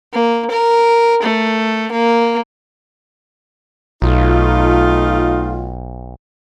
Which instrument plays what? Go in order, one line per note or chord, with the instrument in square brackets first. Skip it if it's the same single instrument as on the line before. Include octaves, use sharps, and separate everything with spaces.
[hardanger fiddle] A#3
A#4
A3
A#3
[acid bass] B1 [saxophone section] A3 D#4 F4